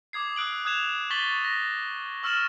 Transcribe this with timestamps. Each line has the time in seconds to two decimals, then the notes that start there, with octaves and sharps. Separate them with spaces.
0.13 D6 D#6 G#6 C7
0.36 D#6 E6 F#6 D7 F#7
0.65 D#6 F#6 G#6 E7 F7
1.10 C#6 A6 B6 F#7 G7
1.44 A#6
2.23 C#6 E6 F6 A6 E7 F#7